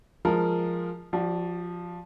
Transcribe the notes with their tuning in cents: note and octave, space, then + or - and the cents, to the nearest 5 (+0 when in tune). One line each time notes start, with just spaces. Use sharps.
F3 +0 G#3 +0 A#4 -15
F3 +5 G4 -45 D5 +0